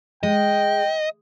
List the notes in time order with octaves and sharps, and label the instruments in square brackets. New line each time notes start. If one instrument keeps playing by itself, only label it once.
[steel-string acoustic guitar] G#3 [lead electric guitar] D#5 [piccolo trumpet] G5